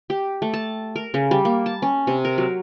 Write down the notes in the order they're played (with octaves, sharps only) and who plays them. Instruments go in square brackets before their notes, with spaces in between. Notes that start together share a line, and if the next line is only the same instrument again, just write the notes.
[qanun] G4
A3
A5
A#4
C#3
G3
A#3
A5
C#4
C3
A#4
F#3